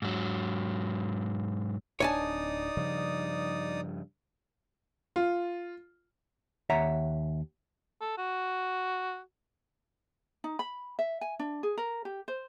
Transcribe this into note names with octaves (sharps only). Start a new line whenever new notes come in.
G#2 F#3
D1 D4 D#4 C#5 D5 G#5 A5 D#6
G2 C#3 F3
F4
D#2 C#5 E5 F#5 A#5
A4
F#4
D#4
B5
E5
G#5
D4
G#4
A#4
G4
C5